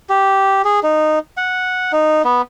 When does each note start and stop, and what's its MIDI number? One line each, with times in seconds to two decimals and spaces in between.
0.09 0.62 67
0.65 0.80 68
0.83 1.19 63
1.37 1.92 78
1.92 2.22 63
2.25 2.42 59